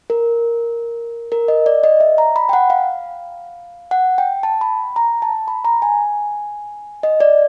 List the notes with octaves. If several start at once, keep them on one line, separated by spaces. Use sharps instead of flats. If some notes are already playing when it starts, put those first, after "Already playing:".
A#4
A#4
D#5
D5
D#5
E5
A#5
B5
G5
F#5
F5
F#5
G5
A5
B5
A#5
A5
B5
A#5
G#5
D#5
D5